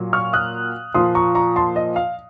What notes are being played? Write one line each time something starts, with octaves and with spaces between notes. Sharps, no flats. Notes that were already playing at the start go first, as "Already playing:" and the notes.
Already playing: A#2 F#3
C#6 F6
D#6 F#6
A#2 F3 C6 D#6
A#5 C#6
A#5 C#6
A5 C6
D#5
F5